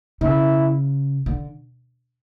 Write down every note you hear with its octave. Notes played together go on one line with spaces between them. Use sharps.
C#3 E4
D3